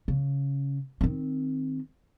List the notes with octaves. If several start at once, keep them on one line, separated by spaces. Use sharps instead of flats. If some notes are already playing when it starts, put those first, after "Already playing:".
C#3
D#3 C4